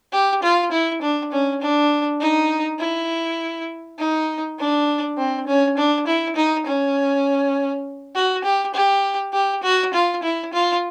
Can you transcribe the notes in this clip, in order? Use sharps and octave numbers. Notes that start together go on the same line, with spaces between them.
G4
F4
E4
D4
C#4
D4
D#4
E4
D#4
D4
C4
C#4
D4
E4
D#4
C#4
F#4
G4
G4
G4
F#4
F4
E4
F4